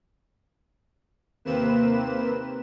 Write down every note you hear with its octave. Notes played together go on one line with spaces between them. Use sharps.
D#2 C3 A#3 C4 B4 E7